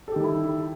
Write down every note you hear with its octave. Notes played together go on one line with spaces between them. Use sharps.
D#3 G3 E4 G4 A4